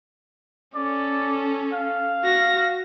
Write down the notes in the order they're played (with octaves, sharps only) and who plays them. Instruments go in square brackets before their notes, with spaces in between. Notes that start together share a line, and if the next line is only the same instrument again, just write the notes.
[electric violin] C#4 A4 [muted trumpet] D5
[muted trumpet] F5
[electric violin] F#4 A#6